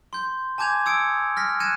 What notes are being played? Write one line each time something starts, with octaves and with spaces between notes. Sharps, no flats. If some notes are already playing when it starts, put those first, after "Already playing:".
C6 G6
G#5 A5 D6 G6 G#6 F7
D#6 E6 G#6 C#7 D7
F6 A#6 B6
F#6 G#6 A#6 C#7 D#7 E7